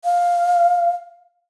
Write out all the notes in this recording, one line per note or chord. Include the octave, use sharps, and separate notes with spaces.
F5